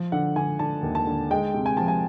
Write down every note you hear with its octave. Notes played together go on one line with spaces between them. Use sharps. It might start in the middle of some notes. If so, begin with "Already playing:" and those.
Already playing: F3
D3 F#5
D3 G#5
D3 A5
D#2
A5
D3
G#3 G5
C3
G#5
F3 A5
G#5